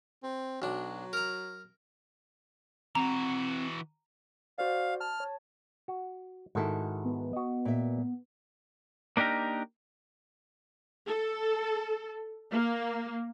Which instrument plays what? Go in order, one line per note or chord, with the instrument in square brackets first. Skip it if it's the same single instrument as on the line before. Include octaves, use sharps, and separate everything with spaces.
[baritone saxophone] C4
[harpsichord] B1 D4 [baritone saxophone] F#3
[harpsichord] A#4 A#5
[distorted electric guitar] E3 F#4 [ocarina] C4 [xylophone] A#5
[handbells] F#4 C5 D5 [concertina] F5
[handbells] A5 [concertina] F6
[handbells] C#5
[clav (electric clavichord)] F#4
[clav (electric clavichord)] G#2 D#3 E4 [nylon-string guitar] F#4 A4
[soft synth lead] B3
[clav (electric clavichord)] F#4 D#5
[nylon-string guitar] A#2 E5
[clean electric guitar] A#3 D4 D#4 G4 A#4
[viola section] A4
A#3